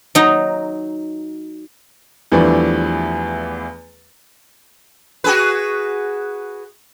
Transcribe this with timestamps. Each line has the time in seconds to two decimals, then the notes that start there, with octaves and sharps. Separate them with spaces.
0.15 F#3 D#4
2.32 E2 E3 F3 G3 A3 D4
5.24 F#4 G#4 B4